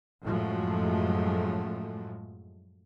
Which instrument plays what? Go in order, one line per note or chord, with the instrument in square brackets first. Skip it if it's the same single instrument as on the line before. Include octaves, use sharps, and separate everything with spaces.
[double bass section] F#2 A2 F3 F#3 G#3 A3